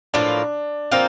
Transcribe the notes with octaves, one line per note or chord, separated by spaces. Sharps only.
A2 F3 A#3 D4 F4
F3 A#3 C4 F4